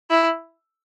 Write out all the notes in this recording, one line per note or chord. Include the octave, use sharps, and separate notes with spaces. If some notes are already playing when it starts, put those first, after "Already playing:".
E4